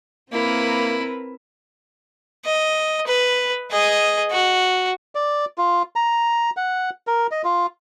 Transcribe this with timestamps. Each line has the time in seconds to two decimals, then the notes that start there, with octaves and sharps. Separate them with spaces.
0.32 A#3 C4 E4 A#4 B4
2.45 D#5
3.07 B4
3.71 G#4 D#5
4.32 F#4
5.15 D5
5.58 F4
5.96 A#5
6.57 F#5
7.07 A#4
7.31 D#5
7.44 F4